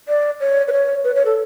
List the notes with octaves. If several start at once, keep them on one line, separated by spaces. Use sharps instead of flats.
D5
C#5
B4
C#5
B4
C#5
A4